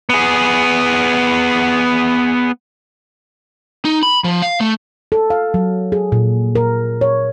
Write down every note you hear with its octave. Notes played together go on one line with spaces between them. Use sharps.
B3 G#4
D#4
B5
F3
F5
A3
A4
F5
F#3
G#4
A#2
A#4
C#5